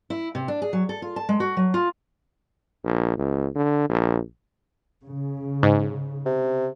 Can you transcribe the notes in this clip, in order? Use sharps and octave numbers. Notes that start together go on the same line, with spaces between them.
E4
C3
D4
G#4
F#3
A4
F4
A5
G#3
F#4
F#3
F4
A#1
C#2
D3
A#1
C#3
G#2
C3